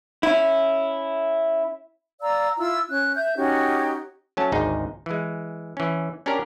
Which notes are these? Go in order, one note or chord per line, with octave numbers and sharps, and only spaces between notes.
C#4 E4
D5 F5 A#5 E6
E4 F4 E6
C#4 F#6
E5 G6
C#4 D#4 F#4 G4
F#3 A3 C#4 A5
G#1 D2 D#4 G#4
E3 G#3
E3 C#4
C#4 D4 G4 A#4 D5